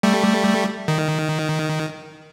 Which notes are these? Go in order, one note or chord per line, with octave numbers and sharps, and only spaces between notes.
G3 A3
D#3